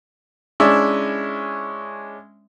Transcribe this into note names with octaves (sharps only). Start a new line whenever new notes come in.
G#3 C#4 D4 E4 D5 E5